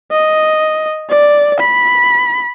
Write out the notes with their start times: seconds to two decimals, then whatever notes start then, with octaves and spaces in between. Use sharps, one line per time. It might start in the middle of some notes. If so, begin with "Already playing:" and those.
0.11 D#5
1.10 D5
1.59 B5